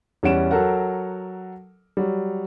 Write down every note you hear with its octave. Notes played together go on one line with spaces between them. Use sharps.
E2 G3 C#4 F#5 D7 E7
F#3 A4 A#4 F#5
F#3 G3